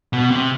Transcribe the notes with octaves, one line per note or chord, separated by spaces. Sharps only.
B2
C3